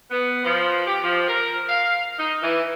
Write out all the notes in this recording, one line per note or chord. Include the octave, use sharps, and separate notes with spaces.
B3
F3
G4
F3
A#4
F5
D#4
E3